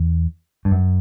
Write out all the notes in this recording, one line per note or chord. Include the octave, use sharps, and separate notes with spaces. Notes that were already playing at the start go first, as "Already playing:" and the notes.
Already playing: E2
G2
F#2